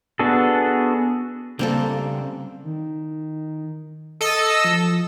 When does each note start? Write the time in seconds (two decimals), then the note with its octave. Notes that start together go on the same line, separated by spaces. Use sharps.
0.19 B3 D4 F#4 G#4 A4
1.59 C#3 G3 A#3 C4 D4 A4
2.64 D#3
4.21 A4 D#5 D#6 E6
4.65 F3